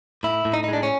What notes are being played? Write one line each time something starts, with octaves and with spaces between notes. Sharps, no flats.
A2 E4
A2
D#4
D#4
G#3 D4
C#4